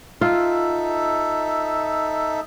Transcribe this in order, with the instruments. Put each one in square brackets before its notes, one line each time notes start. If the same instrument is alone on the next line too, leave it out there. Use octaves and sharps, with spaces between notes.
[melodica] D#4 A4 E5 [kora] F4